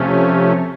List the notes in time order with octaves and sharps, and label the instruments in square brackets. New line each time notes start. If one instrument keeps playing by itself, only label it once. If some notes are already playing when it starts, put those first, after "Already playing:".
Already playing: [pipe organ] C3 F3 A3 C#4